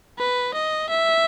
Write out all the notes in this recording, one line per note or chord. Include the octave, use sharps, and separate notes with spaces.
B4
D#5
E5